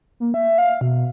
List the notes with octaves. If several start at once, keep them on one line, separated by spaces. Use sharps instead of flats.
A#3
E5
F5
B2